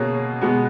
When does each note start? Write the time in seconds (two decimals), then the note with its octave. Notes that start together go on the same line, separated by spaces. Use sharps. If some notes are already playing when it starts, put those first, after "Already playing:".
Already playing: B2 A#3 C#4 G#4
0.41 B2 G#3 B3